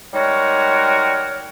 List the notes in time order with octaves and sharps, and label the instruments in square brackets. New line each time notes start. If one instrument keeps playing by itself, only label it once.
[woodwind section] G3 G#3 D#4 F#4 A#4 C#5